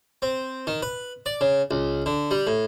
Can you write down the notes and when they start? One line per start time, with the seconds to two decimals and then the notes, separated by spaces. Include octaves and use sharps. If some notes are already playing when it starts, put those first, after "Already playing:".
0.22 C4
0.67 D#3
0.82 B4
1.26 D5
1.41 C#3
1.71 C#2
2.06 D3
2.31 G3
2.47 A2